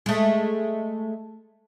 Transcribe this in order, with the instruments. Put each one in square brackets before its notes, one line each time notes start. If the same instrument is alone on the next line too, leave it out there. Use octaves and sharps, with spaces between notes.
[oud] G#3 A3